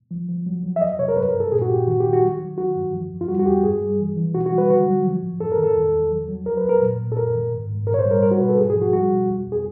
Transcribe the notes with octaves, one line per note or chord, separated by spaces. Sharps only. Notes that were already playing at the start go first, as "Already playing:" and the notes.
F3
F3
F#3
F#3
E5
F2 D#5
C3 C#5
A#4
G2 B4
A#4
G2
A4
A#2 G#4
F#4
A#2 G4
D#3 F#4
D#3 G4
F#4
F#3
F#3
D#3 F#4
G2
F3
F2
F4
G3 F#4
F#4
E2 G4
G2 G#4
G3
E3
E3
B2 F#4
F#4
G3
B4
D3 F#4
F#3
F3
A2
F#2 A4
A#4
D#3
A4
E2
E2
F#3
F#3
F#3 A#4
B4
F2
A#4
A#2
A#2
A4
F#2 A#4
D#3
G#2
G#2
A#2 A#4
C#5
C5
G3
A#4
G3 A#4
F#4
B2 B4
A4
G#2 G#4
G#4
F3
F#4
G3 F#4
B2
F2
F2
G#4